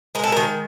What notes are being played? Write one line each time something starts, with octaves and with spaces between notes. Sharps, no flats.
G#3 A#4
A4
A#4
D#3